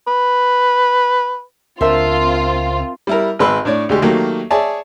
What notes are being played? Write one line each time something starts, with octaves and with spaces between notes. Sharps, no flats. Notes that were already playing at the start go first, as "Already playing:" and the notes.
B4
C#2 C4 D4 F4 A#4 C5 E5 A5
G3 E4 A#4
G#1 G#3 B4 C6 E6 F#6
A2 D4 C#5 D5
D2 G#3 G4
D#3 F#3 A3 A#3 G4
G#4 C#5 D5 E5 A5